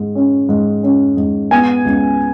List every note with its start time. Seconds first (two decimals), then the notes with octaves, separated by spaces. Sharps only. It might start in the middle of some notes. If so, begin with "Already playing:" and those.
Already playing: G#2
0.15 C#4
0.49 G#2
0.83 C#4
1.17 G#2
1.51 B3 G#5
1.85 C#2